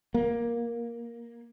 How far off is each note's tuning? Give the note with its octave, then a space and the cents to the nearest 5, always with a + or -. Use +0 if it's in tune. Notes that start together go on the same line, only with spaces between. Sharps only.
A#3 +10